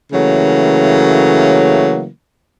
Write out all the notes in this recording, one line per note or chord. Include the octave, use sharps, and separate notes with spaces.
C#3 E3 F#3 A3 A#3